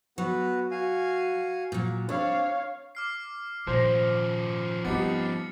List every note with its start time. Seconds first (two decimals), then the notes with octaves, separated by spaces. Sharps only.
0.18 F#3 B3 F#4 B4
0.71 F#4 F5 G#5
1.72 A#2 F#3
2.09 C4 D4 C#5 F5
2.95 D6 F6 C7
3.67 A#2 D#3 F3 C#4 C5 A#6
4.85 G3 B3 C4 D#4 G4 A6 C#7